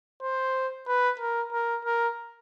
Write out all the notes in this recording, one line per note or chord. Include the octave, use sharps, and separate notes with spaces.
C5
B4
A#4
A#4
A#4